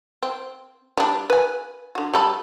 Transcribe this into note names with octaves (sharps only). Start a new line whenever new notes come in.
C4
G3 D4
B4 G#5
D3 F#4
G3 A4 B5